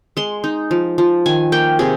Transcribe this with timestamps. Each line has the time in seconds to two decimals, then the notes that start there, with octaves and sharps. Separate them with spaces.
0.17 G#3 C6
0.44 D#4
0.71 F3
0.98 F3
1.26 D#3 G#5
1.52 A#3 G5
1.79 C3 G#4